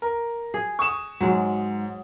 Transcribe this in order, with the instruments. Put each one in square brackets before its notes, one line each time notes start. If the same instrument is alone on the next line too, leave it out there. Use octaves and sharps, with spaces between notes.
[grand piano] A#4
[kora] G#4
[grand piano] C#6 D#6 E7
[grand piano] G#2 [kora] F#3 G#3